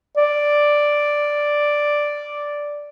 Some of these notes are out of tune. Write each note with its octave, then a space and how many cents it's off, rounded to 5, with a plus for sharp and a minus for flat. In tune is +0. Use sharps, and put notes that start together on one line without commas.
D5 +0